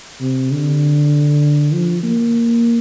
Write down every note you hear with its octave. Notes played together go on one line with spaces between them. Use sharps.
C3
D3
F3
A#3